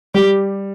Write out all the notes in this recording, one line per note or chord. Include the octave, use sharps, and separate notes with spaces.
G3 G4